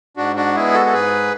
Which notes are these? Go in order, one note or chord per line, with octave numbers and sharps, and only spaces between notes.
G#2 D4 F#4
D4 F#4
G#3 B3 E4 G#4
F#4 A4
A4
G#2 G#4 B4